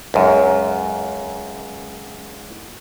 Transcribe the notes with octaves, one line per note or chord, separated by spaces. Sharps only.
C#2 F#2